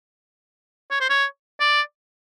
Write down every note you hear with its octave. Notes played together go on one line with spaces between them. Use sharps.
C#5
C5
C#5
D5